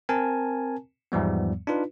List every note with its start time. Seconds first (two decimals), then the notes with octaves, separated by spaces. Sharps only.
0.09 C4 A#4 G#5 A5
1.12 E2 G#2 F3 G3 B3
1.67 D4 D#4 F4 B4